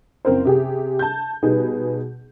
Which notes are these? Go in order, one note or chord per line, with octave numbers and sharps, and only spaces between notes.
F#1 C4 A#4 C5
C3 G4 G#4
A5 G6
B2 G3 B3 D#4 G#4